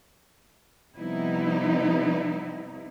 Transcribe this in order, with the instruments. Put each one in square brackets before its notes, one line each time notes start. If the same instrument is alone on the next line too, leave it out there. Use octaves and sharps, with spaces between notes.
[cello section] C3 F3 G3 B3 D#4 E4